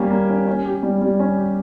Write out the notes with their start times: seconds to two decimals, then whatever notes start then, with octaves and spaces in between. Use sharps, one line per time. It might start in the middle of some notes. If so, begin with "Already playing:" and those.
Already playing: G3 A#3 C#4 G4
0.10 A#3
0.29 C#4
0.47 C#4
0.65 G4
0.83 G3
1.01 G3
1.20 C#4
1.37 G4